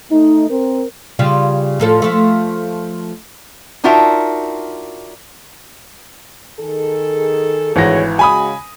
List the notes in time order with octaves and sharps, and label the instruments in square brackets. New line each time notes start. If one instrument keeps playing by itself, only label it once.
[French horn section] A3 D#4
C4 A#4
[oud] C#3 G3 F4
A2 F3 A4
F3 A3
[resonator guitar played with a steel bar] D4 D#4 F4 F#4 A#4 E5
[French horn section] D#3 G#4 A4
[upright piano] G#1 E3 A#6 [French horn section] D2 G#4 C#5
[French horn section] C#3 G#3 F#4 [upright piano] G#5 B5 D#6